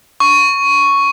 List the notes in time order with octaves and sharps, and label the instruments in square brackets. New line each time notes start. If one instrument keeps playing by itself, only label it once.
[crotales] C#6